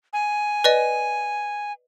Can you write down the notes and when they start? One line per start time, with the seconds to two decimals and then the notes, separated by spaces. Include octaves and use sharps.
0.13 G#5
0.64 B4 D5 D#5